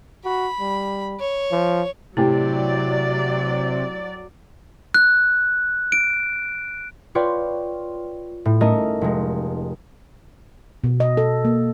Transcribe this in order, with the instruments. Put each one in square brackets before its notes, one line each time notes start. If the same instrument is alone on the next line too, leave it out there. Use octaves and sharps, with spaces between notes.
[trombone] F#4 [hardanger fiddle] B5
[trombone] G3
[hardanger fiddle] C#5
[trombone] F3
[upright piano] A2 G4 G5 [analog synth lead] C3 [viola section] F#3 D5 [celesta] E4
[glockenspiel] F#6
D7
[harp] F4 B4 C#5 D5 G5
A2
A3 C#4 D#4 A4 A#4 D#5
F1 G#3
[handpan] B2
D#5
A4
A#3